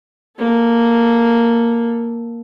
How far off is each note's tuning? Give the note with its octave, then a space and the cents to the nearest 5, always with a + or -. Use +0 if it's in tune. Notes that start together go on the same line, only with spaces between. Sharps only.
A#3 +0 A4 +5